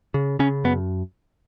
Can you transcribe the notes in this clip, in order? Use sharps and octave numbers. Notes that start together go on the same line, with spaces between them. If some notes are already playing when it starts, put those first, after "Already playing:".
C#3
C#3 C#4
F#2 B3